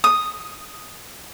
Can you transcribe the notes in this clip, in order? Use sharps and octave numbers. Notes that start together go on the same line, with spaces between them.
D#6